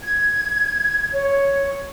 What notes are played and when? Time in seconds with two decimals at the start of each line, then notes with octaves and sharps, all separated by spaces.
0.03 G#6
1.12 C#5